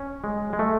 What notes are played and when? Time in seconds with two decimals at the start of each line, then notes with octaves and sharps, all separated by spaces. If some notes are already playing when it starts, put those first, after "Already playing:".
Already playing: C#4
0.24 G#3
0.53 G#3
0.59 A3